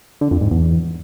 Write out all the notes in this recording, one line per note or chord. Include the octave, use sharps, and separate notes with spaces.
D3
F2
G#2
E2